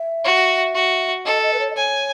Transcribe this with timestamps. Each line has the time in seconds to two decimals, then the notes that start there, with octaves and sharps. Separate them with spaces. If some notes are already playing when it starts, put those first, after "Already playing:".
Already playing: E5
0.24 F#4
0.74 F#4
1.25 A4 D#5
1.42 D#5
1.53 B4
1.59 C#5
1.70 D#5
1.75 C#5 G#5